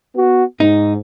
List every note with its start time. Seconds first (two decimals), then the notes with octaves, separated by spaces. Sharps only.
0.15 B3 F#4
0.60 G#2 D#4